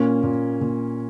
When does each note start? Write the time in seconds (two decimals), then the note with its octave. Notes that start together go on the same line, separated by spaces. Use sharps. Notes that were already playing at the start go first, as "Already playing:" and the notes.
Already playing: A#2 A#3 C#4
0.23 A#2
0.61 A#2